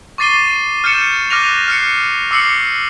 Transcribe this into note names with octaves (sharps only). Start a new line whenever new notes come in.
C#6 D6 A6 C7 D#7 G7
F6 G6 A6 C#7 E7
D6 F6 F#6 A#6 D#7 F7
F6 C7 C#7
D6 E6 C7 C#7 F#7